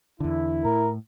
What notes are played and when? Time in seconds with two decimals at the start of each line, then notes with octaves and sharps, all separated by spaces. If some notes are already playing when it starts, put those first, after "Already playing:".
0.20 E2 D3 E4
0.65 A2 A#4